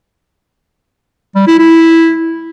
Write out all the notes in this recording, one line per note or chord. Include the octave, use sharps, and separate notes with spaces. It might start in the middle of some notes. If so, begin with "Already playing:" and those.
G3
E4
E4